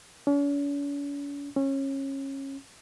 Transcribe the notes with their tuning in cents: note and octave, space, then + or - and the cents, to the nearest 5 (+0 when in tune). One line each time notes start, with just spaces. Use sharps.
C#4 +45
C#4 -25